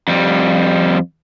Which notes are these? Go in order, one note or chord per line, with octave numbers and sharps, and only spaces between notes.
F2 G3